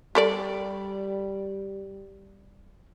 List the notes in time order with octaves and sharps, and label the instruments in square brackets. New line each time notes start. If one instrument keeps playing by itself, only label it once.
[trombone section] G3 [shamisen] G4 A4 D5